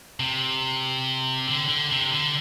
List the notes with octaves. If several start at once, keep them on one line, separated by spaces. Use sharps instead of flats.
C3
D3
D3
C3
D3